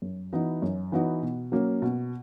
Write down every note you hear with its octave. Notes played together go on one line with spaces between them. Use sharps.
F#2
E3 B3 D#4 F#4
F#2
E3 B3 D#4 F#4
B2
F#3 A#3 C#4
B2